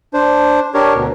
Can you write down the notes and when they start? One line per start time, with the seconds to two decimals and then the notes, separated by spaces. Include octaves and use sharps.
0.13 D4 C5
0.74 D4 G4 A#4 C#5
0.94 D2 B2